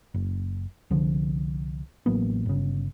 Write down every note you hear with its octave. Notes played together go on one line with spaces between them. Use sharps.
F#1
C2 D3 F3
A1 F#3 A#3 B3
G1 C#3